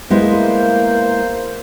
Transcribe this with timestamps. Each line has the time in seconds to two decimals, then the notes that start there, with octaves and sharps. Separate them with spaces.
0.10 G#3 A#3 B3 E4 C5